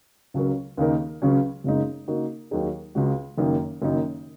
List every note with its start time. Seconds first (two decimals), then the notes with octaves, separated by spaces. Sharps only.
0.34 C#2 C#3 F#3 C#4 A#4
0.77 D#2 C#3 A#3 D#4 A#4
1.22 C#2 C#3 F#3 C#4
1.64 F#1 F#2 C#3 G#3 D#4
2.08 C#3 A#3 D#4 F#4
2.51 D#2 D#3 F#3 D#4 G#4
2.95 C#2 C#3 G#3 F#4
3.38 F#1 F#2 D#3 A#3 D#4
3.82 F#1 F#2 D#3 A#3 D#4